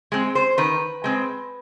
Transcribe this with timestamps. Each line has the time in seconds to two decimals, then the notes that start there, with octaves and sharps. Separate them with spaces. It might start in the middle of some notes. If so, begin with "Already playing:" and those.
0.12 G#3 C4
0.35 C5
0.58 D#3 B4
1.04 G#3 C4